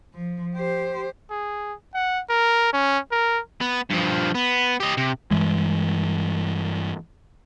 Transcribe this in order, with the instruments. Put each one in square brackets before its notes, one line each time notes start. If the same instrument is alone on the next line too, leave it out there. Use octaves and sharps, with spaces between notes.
[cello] F3
G4 C5
[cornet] G#4
F#5
A#4
C#4
A#4
[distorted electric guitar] B3
G2 F3
B3
G4 D#5
C3
[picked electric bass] G2 E3 G#3